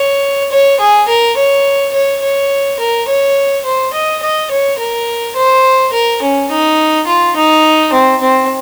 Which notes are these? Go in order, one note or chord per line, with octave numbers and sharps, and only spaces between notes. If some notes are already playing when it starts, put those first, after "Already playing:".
Already playing: C#5
C#5
G#4
A#4
C#5
C#5
C#5
A#4
C#5
C5
D#5
D#5
C#5
A#4
C5
A#4
C#4
D#4
F4
D#4
C4
C4